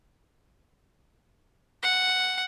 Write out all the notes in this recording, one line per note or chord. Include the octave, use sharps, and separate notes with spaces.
F#5